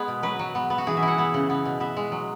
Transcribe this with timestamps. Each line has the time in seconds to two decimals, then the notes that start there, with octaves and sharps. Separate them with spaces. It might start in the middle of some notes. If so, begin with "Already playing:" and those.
Already playing: G#3 B3 G#4
0.08 B2
0.23 F#3 B4
0.39 F#3
0.55 B3
0.70 B3
0.78 F#4
0.87 E3 G#4
0.97 E5
1.03 E4
1.08 F#5
1.18 B3
1.34 C#3
1.50 B3
1.65 B2
1.80 B3 E5
1.96 G#3
2.12 F#3